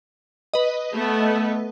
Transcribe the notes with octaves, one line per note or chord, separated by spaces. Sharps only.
B4 D#5
A3 B3